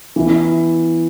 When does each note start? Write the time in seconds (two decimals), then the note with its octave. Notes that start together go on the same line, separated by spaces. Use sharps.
0.16 E3 B3 E4